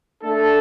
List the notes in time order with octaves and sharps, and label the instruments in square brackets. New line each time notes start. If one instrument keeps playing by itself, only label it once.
[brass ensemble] A3 D4 A4